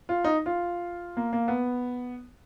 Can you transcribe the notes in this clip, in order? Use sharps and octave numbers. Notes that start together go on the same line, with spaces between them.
F4
D#4
F4
A#3
A#3
B3